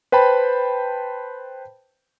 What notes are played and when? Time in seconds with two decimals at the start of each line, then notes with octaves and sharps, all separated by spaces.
0.12 B4 C5 G5 A5 B5